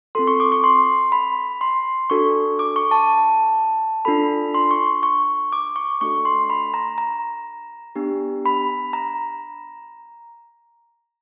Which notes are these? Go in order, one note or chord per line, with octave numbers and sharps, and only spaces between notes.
C4 F4 A4 C6
C#6
D6
C#6
C6
B5
C6
D4 F#4 A4 C#6
D6
C#6
A5
D4 F4 A4 B5
C6
C#6
C#6
C#6
D6
C#6
A3 D4 F#4 A4 C#6
C6
B5
A#5
A#5
B3 D4 G4
B5
A#5